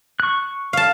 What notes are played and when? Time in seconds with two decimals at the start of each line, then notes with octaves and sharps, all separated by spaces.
0.20 C#6 F#6
0.73 F5 A5